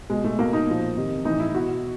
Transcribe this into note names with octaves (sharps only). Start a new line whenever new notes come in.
B2 G#3
A3
B2 A#3
D#4
A#2 F3
C3 D#3
A2 E3 D#4
E4
B2 F#4